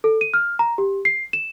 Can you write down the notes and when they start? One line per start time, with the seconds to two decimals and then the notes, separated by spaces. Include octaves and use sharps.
0.04 A4
0.21 D#7
0.34 F6
0.59 A#5
0.78 G4
1.05 C7
1.33 E7